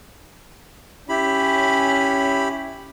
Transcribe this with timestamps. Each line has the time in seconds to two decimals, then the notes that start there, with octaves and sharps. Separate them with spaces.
1.09 C#4 E4 G4 B5